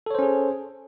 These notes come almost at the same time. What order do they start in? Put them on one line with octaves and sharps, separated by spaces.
A4 C#5 C5 C#4 G#4